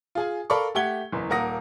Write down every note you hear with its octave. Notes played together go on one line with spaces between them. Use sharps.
F4 G#4 G#5
A4 A#4 D5 F5 B5 C#6
A3 G4 F#5 G#6 G7
F#1 E2
D#1 A#3 A#4 F#5 D#6 A#6